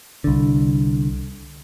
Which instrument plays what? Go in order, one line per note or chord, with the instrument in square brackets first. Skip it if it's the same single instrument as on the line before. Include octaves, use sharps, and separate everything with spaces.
[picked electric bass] C2 D3